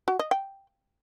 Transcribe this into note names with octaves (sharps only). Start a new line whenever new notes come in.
F#4
D#5
G5